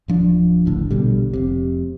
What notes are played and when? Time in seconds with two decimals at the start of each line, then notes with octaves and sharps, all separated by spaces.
0.08 D1 F3 D4
0.65 D1 G#1 A2 D3
0.91 A#1 B2 D3 G3
1.33 F1 C3